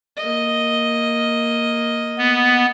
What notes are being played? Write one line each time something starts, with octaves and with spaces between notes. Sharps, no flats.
A#3 D#5
B3